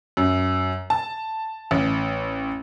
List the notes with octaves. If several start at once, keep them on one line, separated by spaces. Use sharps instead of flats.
F#2
A5
A1